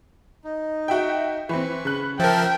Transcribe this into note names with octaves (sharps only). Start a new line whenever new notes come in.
D#4
F#4 E5 G5
E3 C4 B4 C#6
C#3 F#6
F3 A#4 E5 G5 A5